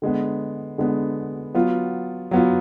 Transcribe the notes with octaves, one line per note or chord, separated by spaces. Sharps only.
D3 G#3 B3
D3 G#3 B3
F#3 B3 F4
F#3 B3 F4